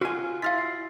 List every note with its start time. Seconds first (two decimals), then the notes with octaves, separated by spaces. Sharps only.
0.01 F4 F#4 G#5
0.42 E4 F5 C6 F6 A6 B6
0.58 C7